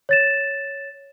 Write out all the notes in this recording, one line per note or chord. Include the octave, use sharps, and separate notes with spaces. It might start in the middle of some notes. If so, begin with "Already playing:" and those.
C#5 A6 E7